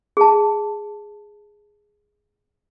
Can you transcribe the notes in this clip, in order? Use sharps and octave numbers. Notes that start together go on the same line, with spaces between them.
G#4 A5